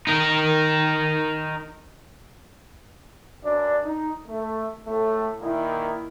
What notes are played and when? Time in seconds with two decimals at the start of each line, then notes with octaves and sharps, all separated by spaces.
0.07 D#4 A#4
3.43 F#2 D4 D5
3.83 D#4
4.27 A3
4.86 A2 A3
5.41 A#2 D#3 A#3 E4